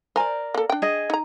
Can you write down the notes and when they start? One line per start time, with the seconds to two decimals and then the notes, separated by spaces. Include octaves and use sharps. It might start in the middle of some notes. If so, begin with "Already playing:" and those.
0.16 A#4 C5 D5 G#5
0.54 A#3 A4
0.69 D4 G5
0.82 G#4 D#5
1.10 D#4 A#5